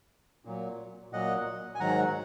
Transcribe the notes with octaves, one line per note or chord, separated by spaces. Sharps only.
A#2 F#3
A#2 F#3 D#5 F#5
G#5
G#2 D#3 F#3 F#5 A#5